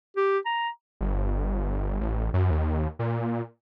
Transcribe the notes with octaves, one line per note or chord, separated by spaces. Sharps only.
G4
A#5
G1
A1
F#2
D#2
A#2